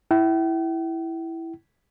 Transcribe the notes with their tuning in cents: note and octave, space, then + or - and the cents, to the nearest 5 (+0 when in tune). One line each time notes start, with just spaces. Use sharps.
E4 +0 G5 -45